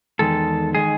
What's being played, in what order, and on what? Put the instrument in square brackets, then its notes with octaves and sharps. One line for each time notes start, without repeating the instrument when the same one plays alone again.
[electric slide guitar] E2 D#3 G#3 A4
D#3 G#3 G#4